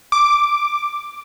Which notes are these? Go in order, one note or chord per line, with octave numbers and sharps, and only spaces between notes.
D6